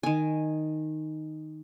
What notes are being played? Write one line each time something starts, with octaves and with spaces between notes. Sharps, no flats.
D#3 G#5